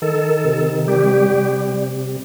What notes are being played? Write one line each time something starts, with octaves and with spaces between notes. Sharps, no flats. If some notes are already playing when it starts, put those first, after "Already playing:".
D#3 A4
C3
G3 G4
C3